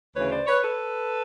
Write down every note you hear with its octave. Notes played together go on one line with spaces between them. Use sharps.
D2 C#3 E3 B4 C#5
C5 D5
B4 C#5
A4 B4